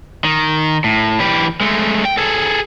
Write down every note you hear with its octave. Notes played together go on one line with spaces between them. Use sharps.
D#3
A2
E3 G4
G#3 A3
G5
G#4 A4